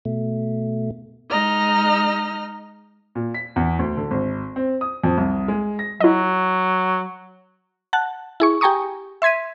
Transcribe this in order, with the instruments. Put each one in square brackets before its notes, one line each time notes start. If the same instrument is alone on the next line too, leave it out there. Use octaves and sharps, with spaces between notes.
[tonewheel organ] B2 A3
[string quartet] G#3 D#4 D#5 A#5 F6
[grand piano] A#2
B6
E2
D2
D3
G#1
C4
D#6
F2
C2
G#3
A#6
[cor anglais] F#3 [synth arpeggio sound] E4 D#5
[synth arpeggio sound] F#5 A5 F#6
E4 G#4 C#6
G4 G5 G#5 A#5 C#6 D#6
E5 C6 G#6 B6 D#7